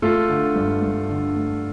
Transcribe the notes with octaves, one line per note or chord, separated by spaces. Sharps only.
A3 F4 A4
D3
G2
G2
D3
A3